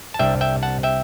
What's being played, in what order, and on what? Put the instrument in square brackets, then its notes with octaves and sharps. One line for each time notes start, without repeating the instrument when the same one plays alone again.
[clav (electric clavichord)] A5
C2 C3 G3 D4 E5 G5
E5 G5
F#5 A5
E5 G5